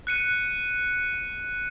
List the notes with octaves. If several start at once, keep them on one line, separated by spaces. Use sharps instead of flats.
F#6 C#7 D#7